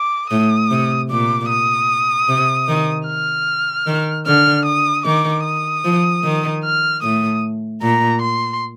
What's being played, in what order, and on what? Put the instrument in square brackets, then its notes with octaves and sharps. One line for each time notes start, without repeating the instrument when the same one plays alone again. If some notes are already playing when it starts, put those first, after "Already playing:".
Already playing: [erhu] D6
[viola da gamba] A2 [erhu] D#6
[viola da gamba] C3
[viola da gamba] A#2 [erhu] D6
[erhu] D#6
[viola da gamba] C3
D#3
[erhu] F6
[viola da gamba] D#3
[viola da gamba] D3 [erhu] F6
[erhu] D#6
[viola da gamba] D#3 [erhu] D6
[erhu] D#6
[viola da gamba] F3
D#3
[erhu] F6
[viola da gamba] A2 [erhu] D#6
[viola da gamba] A#2 [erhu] A#5
[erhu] C6